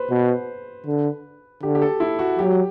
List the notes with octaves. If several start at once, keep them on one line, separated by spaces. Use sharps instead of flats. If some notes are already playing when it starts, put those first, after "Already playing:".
Already playing: B4 C5
B2
D3
D3 G4
G4
A4
E4
F#4
F#3 G4